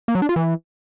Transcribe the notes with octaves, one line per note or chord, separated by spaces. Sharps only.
A#3
F#3
D4
F4
E3